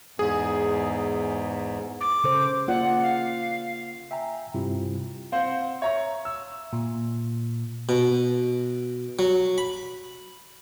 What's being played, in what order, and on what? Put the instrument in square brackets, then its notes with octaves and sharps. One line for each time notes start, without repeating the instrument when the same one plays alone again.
[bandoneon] E2 G#2 [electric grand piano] G#4
[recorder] D6
[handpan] C#3 A4 C5
[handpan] A#3 F4 D5 [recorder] F#5
[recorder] F5
[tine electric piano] E5 G5 G#5 A#5
G2 C3 G3 E4 F4
[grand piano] C4 C5 F#5 [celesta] F5
[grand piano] C#5 A#5 C#6 [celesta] E5
[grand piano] E6
[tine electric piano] A#2
[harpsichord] B2
F#3
B5